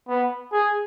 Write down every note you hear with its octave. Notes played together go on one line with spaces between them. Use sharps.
B3
G#4